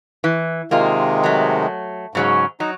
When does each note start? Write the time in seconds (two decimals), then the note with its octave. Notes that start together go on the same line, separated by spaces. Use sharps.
0.24 E3
0.71 C3 D#3 G#3 A#3 F4
1.24 F#3 A3
2.15 G#2 C#3 F#3 C#4
2.60 F#3 D#4